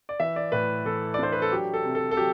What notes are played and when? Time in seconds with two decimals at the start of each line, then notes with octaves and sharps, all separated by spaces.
0.09 D5
0.20 E3 E5
0.36 D5
0.52 A2 B4
0.85 E3 A4
1.14 D5
1.19 D4 C5
1.32 B4
1.42 A4
1.51 F#3 G4
1.74 A4
1.84 C3
1.95 A4
2.11 A4
2.17 F#3 G4